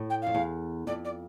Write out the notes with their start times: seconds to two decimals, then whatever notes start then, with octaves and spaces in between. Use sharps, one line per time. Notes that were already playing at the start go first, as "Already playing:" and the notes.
Already playing: A2
0.09 G5
0.22 F5
0.27 F2
0.34 E2
0.86 F2 D5
1.04 D5